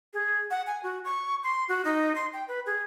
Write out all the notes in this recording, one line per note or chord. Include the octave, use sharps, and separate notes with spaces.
G#4
F#5
G#5
F#4
C#6
C6
F#4
D#4
C6
G5
B4
G#4